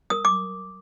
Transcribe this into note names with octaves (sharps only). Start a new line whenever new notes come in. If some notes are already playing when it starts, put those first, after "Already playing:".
A#4 D#6
D6